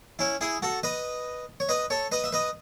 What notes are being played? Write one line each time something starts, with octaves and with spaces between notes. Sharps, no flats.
C#4 E4
E4 G#4
F#4 A4
B4 D#5
C#5
B4 D#5
A4 C#5
B4 D#5
E5
B4 D#5